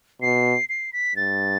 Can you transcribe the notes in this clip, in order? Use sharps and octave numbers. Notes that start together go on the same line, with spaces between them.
B2 C7
C7
B6
G2 A6